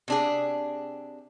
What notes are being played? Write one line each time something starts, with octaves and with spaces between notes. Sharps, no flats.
C3 D4 G#4